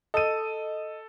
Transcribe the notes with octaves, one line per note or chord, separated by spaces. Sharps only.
A4 D#5 D#7